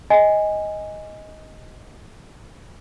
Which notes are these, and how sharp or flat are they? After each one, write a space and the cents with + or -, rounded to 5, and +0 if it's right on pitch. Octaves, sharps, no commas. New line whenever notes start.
D#5 +10 G#5 -10